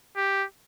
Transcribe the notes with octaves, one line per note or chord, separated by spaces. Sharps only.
G4